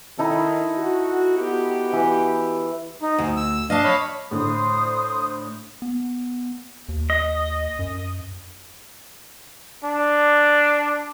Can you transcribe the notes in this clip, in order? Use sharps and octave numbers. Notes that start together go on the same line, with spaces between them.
D#3 D#4 E4 A4
F#4
B3 F#4 G4
E3
D#4
D2
E6
D4 D#5 F5 A5
C#5 F5 B5
A2 D3 C5 D#6
B3
D#2
D#5
F#2
D4